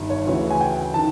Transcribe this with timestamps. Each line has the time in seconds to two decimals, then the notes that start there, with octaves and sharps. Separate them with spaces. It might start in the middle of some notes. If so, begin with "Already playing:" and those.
Already playing: G1 G2 D#3
0.10 C#5
0.27 D2 C#3 E3
0.51 G#5
0.61 G5
0.94 D#3 A5